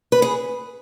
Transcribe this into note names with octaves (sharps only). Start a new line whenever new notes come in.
B4
G#4